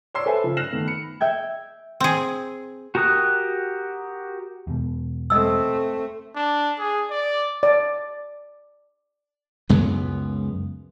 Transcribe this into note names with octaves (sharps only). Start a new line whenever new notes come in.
C#5 D5 C6 E6 C7
A4 B4 C5 E5 G#5
C#3 F3
F6 F#6 A#6 C7 E7 F#7
D#3 A3 B3 B4
B5 C#7
E5 G5 G#6
C4 G#4
F#4 G4 A#4 D#6 F#6
E2 B2
A3 C4 D#5 D#6 E6
D4
G#4
D5
D5
C#2 F#2 G#3 B3